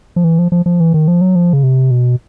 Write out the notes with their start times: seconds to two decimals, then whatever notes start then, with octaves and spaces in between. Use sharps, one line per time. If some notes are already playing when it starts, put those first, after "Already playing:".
0.16 F3
0.24 E3
0.39 F3
0.52 F3
0.66 F3
0.80 E3
0.94 D#3
1.08 F3
1.21 F#3
1.35 F3
1.53 C#3
1.63 C3
1.91 B2